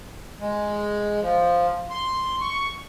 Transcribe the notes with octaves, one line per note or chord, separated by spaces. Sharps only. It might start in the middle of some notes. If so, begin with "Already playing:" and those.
G#3
F3
C6
C#6